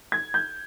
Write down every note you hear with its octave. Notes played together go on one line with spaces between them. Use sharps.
G#6
G6